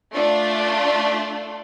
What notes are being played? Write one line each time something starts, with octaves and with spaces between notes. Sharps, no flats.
A3 D4 F4